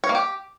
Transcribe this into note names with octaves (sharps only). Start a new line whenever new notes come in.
C#5
A#3
G4